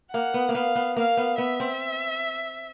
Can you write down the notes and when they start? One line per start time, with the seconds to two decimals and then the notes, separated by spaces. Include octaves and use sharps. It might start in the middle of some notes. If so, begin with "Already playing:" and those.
0.13 A#3 F#5
0.34 B3
0.49 A#3
0.55 B3 F5
0.75 B3
0.96 A#3 F5
1.17 B3
1.38 B3 E5
1.60 C4